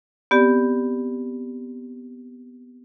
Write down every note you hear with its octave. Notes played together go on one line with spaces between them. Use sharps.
B3 C4 G4 D5